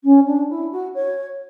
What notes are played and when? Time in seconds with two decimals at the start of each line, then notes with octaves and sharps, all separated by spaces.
0.04 C#4
0.27 D4
0.49 E4
0.71 F#4
0.94 C#5